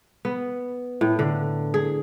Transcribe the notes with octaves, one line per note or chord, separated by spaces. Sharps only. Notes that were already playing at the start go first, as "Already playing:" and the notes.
B3
A2
D3
G#4